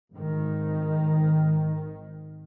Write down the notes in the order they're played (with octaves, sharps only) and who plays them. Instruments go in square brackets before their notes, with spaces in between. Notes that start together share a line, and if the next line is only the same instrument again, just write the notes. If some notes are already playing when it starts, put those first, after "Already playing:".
[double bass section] G#1 D#3